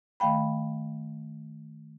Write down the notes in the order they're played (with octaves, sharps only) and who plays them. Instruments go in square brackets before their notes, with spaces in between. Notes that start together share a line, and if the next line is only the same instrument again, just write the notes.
[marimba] D#3 A3 F5 G5 B5